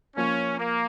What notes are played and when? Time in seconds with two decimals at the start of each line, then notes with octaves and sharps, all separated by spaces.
0.16 F3 A#3 C#4 F4
0.58 A#3